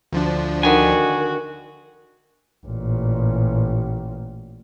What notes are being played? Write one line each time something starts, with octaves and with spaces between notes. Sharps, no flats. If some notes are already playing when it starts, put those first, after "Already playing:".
D2 F3 D4
D3 D#3 F#4 G#5
A1 A#2